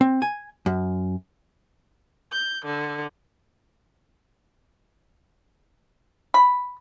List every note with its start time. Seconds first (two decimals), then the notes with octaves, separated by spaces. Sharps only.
0.01 C4
0.22 G#5
0.66 F#2
2.32 G6
2.65 D3
6.34 B5